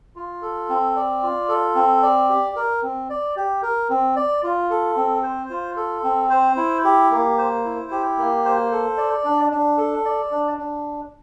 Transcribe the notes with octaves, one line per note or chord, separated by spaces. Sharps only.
F4
A4
C4
D5
F4
A4
C4
D5
G4
A#4
C4
D5
G4
A#4
C4
D5
F4
A4
C4
C5
F4
A4
C4
C5
E4
G4
A#3
C5
E4
G4
A#3
C5
A4
D5
D4
D4
A4
D5
D4
D4